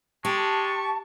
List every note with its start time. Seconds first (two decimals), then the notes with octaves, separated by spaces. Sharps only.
0.25 G#3 G4 A5 C#6